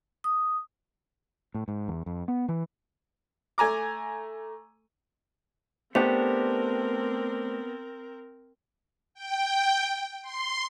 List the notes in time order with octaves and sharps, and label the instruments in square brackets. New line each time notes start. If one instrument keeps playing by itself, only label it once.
[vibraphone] D#6
[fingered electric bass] A2
G#2
E2
F2
B3
E3
[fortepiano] A3 G#5 A#5 D6
[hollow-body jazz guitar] A3 D4 G4 [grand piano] B3 [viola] C4 A#4 [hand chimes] C5
[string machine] G5
C6